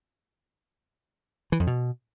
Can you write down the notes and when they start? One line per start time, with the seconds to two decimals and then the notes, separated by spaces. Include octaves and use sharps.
1.52 E3
1.60 F2
1.67 B2